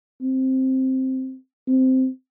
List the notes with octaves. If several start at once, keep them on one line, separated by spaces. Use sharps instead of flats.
C4
C4